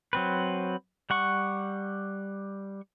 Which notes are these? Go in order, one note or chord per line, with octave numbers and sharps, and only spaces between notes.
F#3 C4 B4
G3 F#5 C#6